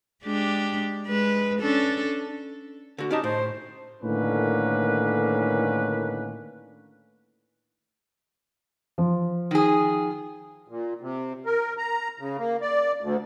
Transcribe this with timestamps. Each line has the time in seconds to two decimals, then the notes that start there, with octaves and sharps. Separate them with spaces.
0.23 G#3 D4 G4
1.07 G#3 B4
1.60 C#4 D4 A4
2.98 D3 F#4
3.11 C#4 D#4 G4 A5
3.24 A2 C5
4.02 A2 D3 D#3 A#3 C#4 B4
8.98 F3
9.51 D#3 G#4
10.68 A#2
11.01 C3
11.46 A#4
11.77 A#5
12.19 C#3
12.38 A#3
12.61 D5
13.00 D2